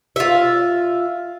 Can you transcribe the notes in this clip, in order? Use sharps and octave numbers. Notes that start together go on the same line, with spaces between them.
F4 E5